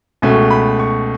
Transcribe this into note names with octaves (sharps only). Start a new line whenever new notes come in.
C#2 B2 A3 C#4
B5
C#6